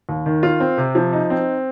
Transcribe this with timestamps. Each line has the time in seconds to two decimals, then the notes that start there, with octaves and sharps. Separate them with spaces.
0.09 D#2
0.26 D#3
0.43 F4
0.60 C4
0.78 C3
0.95 F3
1.13 D#4
1.30 C4